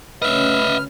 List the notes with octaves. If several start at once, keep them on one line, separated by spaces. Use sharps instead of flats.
D2 C#3 C#4 B4 D#5 E5 F6